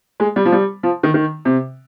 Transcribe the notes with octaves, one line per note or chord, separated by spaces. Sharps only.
G#3
G3
F3
G3
F3
D#3
D#3
C3